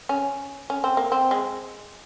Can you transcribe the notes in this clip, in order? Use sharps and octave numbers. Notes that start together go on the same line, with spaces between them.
C#4
C#4
C4
A#3
C4
G#3